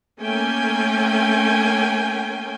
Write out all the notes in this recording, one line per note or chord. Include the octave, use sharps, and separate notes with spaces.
A3 A#3 C#4 G5 G#5